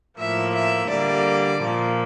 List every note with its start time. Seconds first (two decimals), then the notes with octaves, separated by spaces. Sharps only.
0.19 A2 F3 A#3 E5
0.53 E5
0.89 D3 G3 A#3 D5
1.60 A#2 F3 A#3